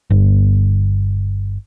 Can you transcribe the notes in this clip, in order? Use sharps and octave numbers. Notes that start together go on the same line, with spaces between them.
G1